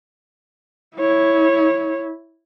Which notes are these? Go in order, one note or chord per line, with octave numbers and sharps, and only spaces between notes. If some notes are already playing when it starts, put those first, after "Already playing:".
E4 C#5